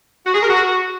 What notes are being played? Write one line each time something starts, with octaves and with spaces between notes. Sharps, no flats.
F#4
G#4
A#4
F#4